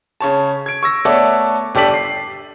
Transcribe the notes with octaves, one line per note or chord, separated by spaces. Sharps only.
C#3 C#5 A5
G#6 D7
C#6 E6 A#6
A3 B3 A4 C#5 D5 E5
G1 G4 A4 D5 B6 F#7
C7